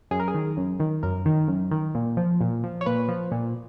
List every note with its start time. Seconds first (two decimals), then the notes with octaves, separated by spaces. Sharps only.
0.11 F#2 G#4
0.20 A#4
0.28 G#4
0.34 D#3
0.57 F#2
0.80 D#3
1.03 F#2 A#4
1.26 D#3
1.48 F#2
1.71 D#3
1.95 A#2
2.17 F3
2.41 A#2
2.63 F3
2.81 C#5
2.86 A#2 B4
3.08 F3
3.31 A#2